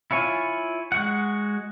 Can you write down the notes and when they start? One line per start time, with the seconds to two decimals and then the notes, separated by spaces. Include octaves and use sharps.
0.11 E4 F4 C#5 G#5
0.92 G#3 F#4 F#5